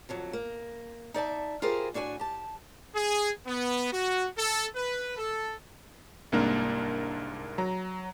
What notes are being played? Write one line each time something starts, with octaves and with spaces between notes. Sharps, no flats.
F2 D3 F#3
A#3
D#4 D5 E5 A5
E4 F4 G4 G#4 A#4 C5
A2 D4 F#4 E5 G#5
G4 A5
G#4
B3
F#4
A4
B4
A4
C2 G#2 A#3 D4 A#4
F#3 A#5